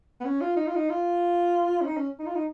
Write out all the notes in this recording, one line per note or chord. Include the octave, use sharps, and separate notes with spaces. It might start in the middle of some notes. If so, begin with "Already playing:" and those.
B3
C#4
F4
D#4
F4
D#4
F4
C#4
D#4
C#4
D#4
F4
D#4